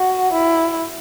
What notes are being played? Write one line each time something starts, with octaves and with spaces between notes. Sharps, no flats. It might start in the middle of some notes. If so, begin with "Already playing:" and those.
Already playing: F#4
E4